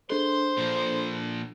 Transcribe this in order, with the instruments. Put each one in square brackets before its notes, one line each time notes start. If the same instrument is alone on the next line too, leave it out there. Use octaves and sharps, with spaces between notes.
[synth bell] D4 A4 [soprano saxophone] C5 [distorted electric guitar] C6
[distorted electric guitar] A#2 F3